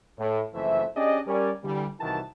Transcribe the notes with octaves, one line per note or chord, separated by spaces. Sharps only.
A2
F#1 F2 E3 A3 C5 E5
C#4 D4 G4 G#4 D5 D#5
G3 C#4 A#4 D5
D3 E3 G3
C2 D#3 E3 F#4 A5